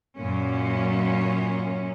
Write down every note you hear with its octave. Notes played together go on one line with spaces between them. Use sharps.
F#2 A#2 C#4